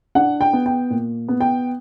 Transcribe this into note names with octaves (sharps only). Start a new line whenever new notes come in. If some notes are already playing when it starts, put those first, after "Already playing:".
D4 F#5
G5
B3
G5
A#2
B3
G5